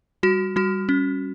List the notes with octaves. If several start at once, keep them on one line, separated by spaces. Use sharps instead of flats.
G3 F#4
G3 F#4
C#4